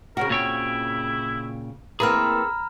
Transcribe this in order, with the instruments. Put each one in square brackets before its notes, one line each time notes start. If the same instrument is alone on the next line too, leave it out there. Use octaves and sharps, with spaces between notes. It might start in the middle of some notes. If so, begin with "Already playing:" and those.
[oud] C#3 C4 F#4 [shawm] A#4
[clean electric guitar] A#2 C#5 G5 [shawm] E4
[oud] E3 A#3 C4 [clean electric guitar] G#4 [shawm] A4 [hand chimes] A#5 B5 F6